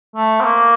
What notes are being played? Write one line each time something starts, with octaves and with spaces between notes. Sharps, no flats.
A3
C4
A#3